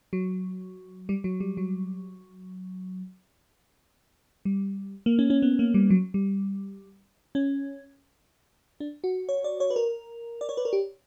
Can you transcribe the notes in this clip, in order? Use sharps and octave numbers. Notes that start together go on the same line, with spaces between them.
F#3
G3
F#3
G3
F#3
G3
A#3
C#4
C#4
B3
A#3
G3
F#3
G3
C#4
D4
F#4
C#5
D5
C#5
B4
A#4
D5
C#5
B4
A#4
G4